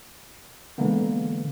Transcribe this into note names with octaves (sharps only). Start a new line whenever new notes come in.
D3 E3 G#3 A#3 B3